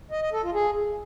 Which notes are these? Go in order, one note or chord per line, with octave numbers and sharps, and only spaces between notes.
D#5
D#5
A4
F4
G#4